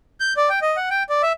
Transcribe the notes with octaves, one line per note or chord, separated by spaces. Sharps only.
G6
D5
G5
D#5
F#5
G5
D5
E5